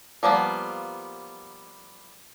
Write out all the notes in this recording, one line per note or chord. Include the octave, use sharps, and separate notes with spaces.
F3 G3 A#3 B3